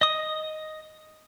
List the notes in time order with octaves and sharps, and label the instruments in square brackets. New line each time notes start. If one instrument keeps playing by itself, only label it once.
[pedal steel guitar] D#5 D#6